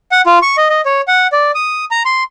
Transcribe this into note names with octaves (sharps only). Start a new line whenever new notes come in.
F#5
F4
C#6
D#5
D#5
C#5
F#5
D5
D#6
A#5
C6